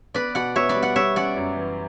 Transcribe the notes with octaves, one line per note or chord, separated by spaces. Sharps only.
B3 B4 D5
B2 D5 F#5
B2 C#5 E5
B4 D5
G3
D5 F#5
G3 C#5 E5
C#4 D5 F#5
F#2
E3